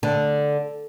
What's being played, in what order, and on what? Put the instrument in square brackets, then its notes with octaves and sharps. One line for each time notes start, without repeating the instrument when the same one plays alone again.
[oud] D3